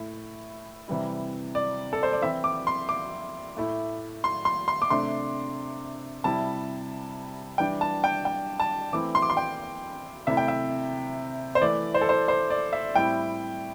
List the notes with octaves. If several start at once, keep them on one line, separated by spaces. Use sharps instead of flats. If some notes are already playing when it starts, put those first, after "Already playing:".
Already playing: A2 A3 E4
C3 E3 G3 E4
D5
A4
C5
D5
E3 C4 E4 E5
D6
C6
D6
A2 A3 E4
C6
C6
C6
D6
C3 A3 D4 C6
C3 G3 E4 A5
E3 G3 D4 G5
A5
G5
G5
A5
E3 A3 C4 E4 D6
C6
D6
C6
G5
C3 A3 E4 E5
G5
E5
C5
E3 A3 E4 D5
C5
A4
C5
C5
D5
E5
A2 G3 C4 E4 G5